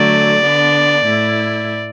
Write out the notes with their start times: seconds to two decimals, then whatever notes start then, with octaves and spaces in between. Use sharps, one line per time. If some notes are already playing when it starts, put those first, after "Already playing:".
Already playing: D3 F#3 A3 D5
0.41 D3 B3 D4
1.05 A2 A3 E4